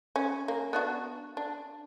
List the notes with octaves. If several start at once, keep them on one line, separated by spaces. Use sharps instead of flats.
C#4
A#3
B3 D4 F#4
D4